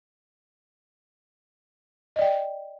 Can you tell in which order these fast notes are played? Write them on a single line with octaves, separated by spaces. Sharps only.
D#5 D5 G5